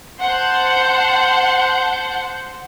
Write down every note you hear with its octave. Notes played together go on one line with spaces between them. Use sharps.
C5 F#5 A5 C6 G6